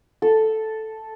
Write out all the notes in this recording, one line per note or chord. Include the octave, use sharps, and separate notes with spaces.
A4